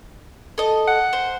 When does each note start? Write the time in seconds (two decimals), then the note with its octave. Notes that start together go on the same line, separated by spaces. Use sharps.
0.58 A4 D#5
0.88 F#5
1.13 C5